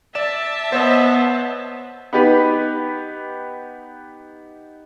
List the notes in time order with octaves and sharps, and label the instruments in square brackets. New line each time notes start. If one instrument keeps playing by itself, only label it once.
[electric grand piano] D5 E7 [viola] E5 A5
[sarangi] B3 [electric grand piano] C5 C#5 D#5
[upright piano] B3 D#4 G4 B4